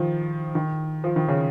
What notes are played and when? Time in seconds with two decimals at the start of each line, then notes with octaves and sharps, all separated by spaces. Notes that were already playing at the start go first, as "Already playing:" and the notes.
Already playing: D#3 F3
0.55 D#3
1.04 F3
1.16 D#3
1.29 C#3